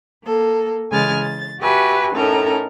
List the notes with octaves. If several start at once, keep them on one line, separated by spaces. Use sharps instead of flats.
A#3 A4
C#3 E3 G#3 G#5 F6 A6
A6
F#4 G4 B4 E5 G#5 C#6
A2 C#4 D#4 A4 A#4 A#5